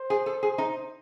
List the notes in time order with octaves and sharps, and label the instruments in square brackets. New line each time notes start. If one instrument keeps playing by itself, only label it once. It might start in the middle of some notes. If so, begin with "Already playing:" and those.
Already playing: [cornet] C5
[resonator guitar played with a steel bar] G#4
A4
G#4
D#4